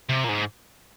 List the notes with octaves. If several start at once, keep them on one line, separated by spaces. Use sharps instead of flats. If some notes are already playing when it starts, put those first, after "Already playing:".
C3
A#2
G#2